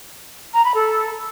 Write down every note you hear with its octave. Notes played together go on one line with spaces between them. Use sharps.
A#5
B5
A4